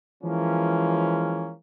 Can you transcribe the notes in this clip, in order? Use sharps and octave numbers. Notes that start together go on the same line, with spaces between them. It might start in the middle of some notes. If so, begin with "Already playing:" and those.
E3 F3 G#3 A#3 C#4